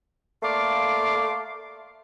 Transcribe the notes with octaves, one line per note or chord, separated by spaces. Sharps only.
A3 A#3 D5 F5 C6 D6